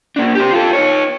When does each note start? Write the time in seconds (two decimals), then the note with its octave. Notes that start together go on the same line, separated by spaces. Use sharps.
0.16 A#3 D4
0.35 G4 C5
0.52 F4 A4
0.73 D#4 C#5